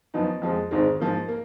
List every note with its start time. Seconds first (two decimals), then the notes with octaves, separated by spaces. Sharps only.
0.14 F#2 F3 B3 D#4
0.42 F2 F3 G#3
0.71 G#1 G#2 D#3 G#3
1.00 G#2 F3 A#3
1.28 A#3